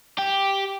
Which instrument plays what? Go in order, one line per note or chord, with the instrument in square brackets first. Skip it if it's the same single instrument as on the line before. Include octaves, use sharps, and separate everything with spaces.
[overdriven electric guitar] G4